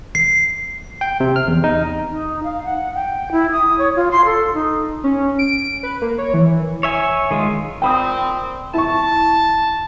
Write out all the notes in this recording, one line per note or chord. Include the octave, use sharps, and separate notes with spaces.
C7
G5
C3
F6
E2
D#4
D#4
F5
F#5
G5
E4
D#6
C#5
F4
C6
A4
D#4
C#4
D7
B4
A#3
C#5
E3
C#5 E5 G#5
D#3 G#3 F4
A#2 C4 G5 B5 D#6
E4 A5 C#6